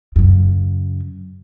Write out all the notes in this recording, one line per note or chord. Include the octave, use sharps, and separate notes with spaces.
F#2 C#3